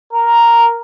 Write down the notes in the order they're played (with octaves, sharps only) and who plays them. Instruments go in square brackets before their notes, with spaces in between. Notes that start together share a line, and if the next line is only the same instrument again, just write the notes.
[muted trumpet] A#4